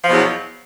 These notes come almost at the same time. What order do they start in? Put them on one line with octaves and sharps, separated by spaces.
F3 B2 E2 F#3